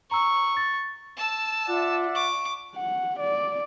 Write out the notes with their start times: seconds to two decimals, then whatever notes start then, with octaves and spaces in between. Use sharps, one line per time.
0.11 A#5 C#6 E6
0.57 A6
1.17 A5 E6
1.68 F4 D5 E5 F#5
2.14 C#6 D6
2.76 F#5
3.20 D5